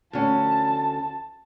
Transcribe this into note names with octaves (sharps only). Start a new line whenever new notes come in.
D2 C#4 A5